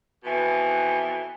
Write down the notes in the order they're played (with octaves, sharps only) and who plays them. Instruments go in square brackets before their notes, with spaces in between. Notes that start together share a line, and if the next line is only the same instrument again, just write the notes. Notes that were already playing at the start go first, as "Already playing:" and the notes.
[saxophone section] F2 B2 E3